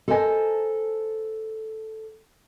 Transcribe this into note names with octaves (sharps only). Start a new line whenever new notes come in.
A4 A#4 C5 D#5 G#5 A5